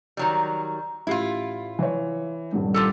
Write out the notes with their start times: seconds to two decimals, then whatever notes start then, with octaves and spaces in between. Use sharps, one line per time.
0.17 D#3 F#3 G3
1.07 A1 E4 F4 G4 C7
1.79 E3 C#5
2.52 D#1 C2 G2
2.74 F4 G4 A4